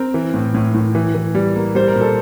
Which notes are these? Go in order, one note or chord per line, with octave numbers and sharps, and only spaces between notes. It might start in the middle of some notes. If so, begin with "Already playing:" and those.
Already playing: C4 A#4
E3
A2
A2
A2
E3
E3
G3
A#3
G3 C5
A#4
A#2
A4